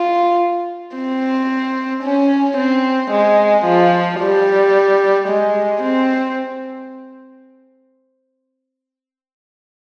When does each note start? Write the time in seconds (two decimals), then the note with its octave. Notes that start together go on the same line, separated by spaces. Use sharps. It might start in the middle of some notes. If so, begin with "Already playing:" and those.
Already playing: F4
0.95 C4
2.03 C#4
2.57 C4
3.11 G#3
3.65 F3
4.20 G3
5.28 G#3
5.82 C4